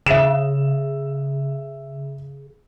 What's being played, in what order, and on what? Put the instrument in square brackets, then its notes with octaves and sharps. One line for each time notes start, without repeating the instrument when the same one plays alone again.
[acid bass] C#3 [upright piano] E5 E7